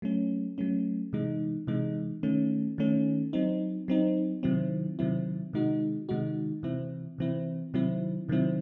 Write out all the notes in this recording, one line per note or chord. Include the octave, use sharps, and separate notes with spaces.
F#3 A3 C#4
F#3 A3 C#4
C3 E3 G#3 D#4
C3 E3 G#3 D#4
D#3 A3 C#4
D#3 A3 C#4
F#3 C4 D#4
F#3 C4 D#4
C3 D#3 F#3 C4 E4
C3 D#3 F#3 C4 E4
C3 D#3 G#3 D#4 F#4
C3 D#3 G#3 D#4 F#4
C3 E3 C4 E4
C3 E3 C4 E4
C3 D#3 F#3 C4 E4
C3 D#3 F#3 C4 E4